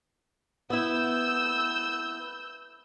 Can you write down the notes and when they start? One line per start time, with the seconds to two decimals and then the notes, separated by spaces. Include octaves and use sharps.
0.70 B3 E4 E6 G6